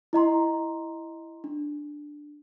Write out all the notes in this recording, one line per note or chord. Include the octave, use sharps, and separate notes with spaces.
E4 D#5 A#5 C6
D4